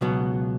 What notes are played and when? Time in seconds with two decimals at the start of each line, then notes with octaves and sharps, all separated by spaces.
0.01 C#2 B2 F#3 B3